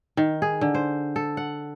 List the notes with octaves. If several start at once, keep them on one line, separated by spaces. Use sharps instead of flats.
D#3
G#4
D3
C5
A4
F#5